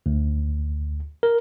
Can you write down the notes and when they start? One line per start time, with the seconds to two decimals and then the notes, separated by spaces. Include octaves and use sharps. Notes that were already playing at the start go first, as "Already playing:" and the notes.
0.06 D2
1.23 A#4